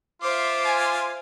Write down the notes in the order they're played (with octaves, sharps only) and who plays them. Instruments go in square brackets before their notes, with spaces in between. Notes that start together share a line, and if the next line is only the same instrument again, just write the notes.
[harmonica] F4 [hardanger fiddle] C5 E5 [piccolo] D6
[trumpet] G#5